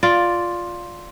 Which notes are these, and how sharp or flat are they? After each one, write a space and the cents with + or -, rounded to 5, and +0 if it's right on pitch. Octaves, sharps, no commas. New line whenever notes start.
F4 +5 D5 +0